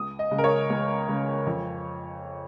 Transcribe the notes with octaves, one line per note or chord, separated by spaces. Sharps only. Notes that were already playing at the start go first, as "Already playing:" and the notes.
Already playing: C#2 D#6
D#5
C#3 G#3
A#4
C#5
C#2
C#3 G#3
F2